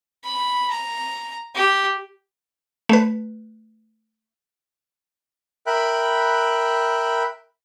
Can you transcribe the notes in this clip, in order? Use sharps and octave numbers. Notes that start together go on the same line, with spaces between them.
B5
A#5
G4
A3 B4
A#4 E5 G5 B5 F#6